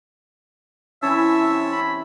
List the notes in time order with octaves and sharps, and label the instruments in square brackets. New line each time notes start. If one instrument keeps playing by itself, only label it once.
[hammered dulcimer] E3 C4 E4 [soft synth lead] C#4 [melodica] C#5 A5 E6 [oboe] E5
[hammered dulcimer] C3
[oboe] B5